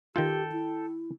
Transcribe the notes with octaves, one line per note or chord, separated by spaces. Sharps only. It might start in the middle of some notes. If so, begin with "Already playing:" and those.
D#3 F4 G4 A4 G5
E4